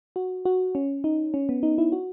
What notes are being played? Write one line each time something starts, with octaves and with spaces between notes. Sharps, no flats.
F#4
F#4
C#4
D#4
C#4
B3
D#4
E4
F#4